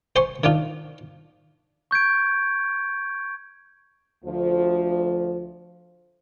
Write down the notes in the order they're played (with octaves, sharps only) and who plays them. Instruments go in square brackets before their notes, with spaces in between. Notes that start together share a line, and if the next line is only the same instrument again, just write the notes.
[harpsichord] C5 G#5 C6 C#6
D#3 D4 F4
[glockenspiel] C#6 G6 G#6 D7
[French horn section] D2 F3